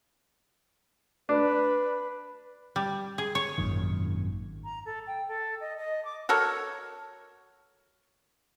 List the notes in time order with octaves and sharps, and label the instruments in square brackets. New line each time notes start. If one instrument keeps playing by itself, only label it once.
[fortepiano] D4 [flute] B4
[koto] G3
G#4
C#5
[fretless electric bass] G#1 F#2 A#2 D#3
[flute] A#5
A4
G5
A4
D#5
D#5
D6
[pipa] F#4 A4 A#4 C#5